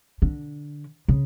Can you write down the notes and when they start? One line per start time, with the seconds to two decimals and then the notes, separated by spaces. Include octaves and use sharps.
0.22 D3
1.08 C#3